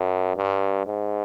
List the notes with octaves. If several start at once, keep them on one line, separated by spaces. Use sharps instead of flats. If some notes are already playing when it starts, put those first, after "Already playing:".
Already playing: F#2
G2
G#2